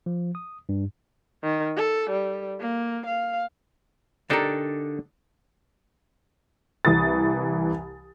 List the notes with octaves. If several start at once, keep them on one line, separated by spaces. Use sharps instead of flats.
F3
D#6
G2
D#3
A4
G3
A#3
F5
D3 D4 D#4 G4 A4 A#4
C2 E3 D#6 A6